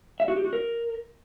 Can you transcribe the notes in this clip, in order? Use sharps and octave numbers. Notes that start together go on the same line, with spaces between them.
E5
F#4
G4
F#4
A#4